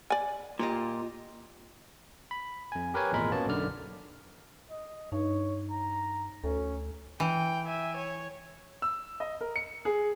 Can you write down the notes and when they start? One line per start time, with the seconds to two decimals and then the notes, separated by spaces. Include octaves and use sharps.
0.10 D5 G#5
0.59 A#2 F4 G4 D#5
2.31 B5
2.72 F2 G#5
2.94 G4 A#4 B4 C#5 G#5
3.12 G#1 E2 A#2 G#3 A#4 B5
3.31 A#3 B3 C#4 F#4 A5
3.46 B1 F#2 D3 D5 F6
4.70 D#5
5.12 G2 D#4 C#5
5.71 A#5
6.44 D2 C#4 A4
7.20 E3 G5
7.67 E5 G#5
7.96 C#5
8.82 E6
9.20 D#5
9.41 A#4
9.56 C#7
9.85 G#4